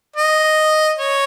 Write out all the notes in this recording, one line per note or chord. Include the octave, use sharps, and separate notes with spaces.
D#5
C#5